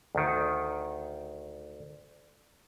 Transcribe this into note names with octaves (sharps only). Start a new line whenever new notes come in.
D2 D#3